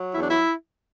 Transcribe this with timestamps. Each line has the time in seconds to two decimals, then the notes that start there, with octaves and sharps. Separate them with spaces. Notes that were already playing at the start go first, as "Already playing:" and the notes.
Already playing: F#3
0.13 E2 E4
0.21 D4
0.30 E4